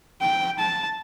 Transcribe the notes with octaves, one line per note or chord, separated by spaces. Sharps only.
G5
A5